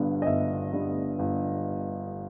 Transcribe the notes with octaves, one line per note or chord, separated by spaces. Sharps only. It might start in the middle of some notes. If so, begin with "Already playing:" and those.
Already playing: G1 G2 D3 G3 B3
D#5
G1 E5
G2 D3 G3 B3
G1